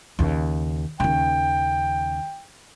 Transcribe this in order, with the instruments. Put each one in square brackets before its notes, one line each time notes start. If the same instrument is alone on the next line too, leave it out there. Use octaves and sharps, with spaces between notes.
[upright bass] D#2 C#3
[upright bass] D#2 C#3 [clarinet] G5